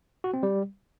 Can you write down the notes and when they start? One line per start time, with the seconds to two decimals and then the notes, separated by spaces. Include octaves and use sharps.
0.24 F#4
0.34 C4
0.43 G3